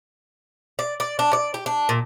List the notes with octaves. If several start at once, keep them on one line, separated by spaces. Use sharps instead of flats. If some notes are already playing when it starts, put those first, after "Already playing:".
D5
D5
D4
D5
G4
D4
A#2